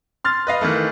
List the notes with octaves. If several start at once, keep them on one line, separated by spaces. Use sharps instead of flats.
C6 F6 A6
B4 D#5 F5
D#3 E3 A3